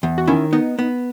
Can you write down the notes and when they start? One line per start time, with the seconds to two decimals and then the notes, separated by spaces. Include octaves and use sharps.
0.03 E2
0.18 F#4
0.28 D#3 C#4 E4
0.53 B3 D#4
0.79 B3